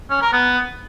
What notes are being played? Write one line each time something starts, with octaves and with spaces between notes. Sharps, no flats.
C#4
A#4
B3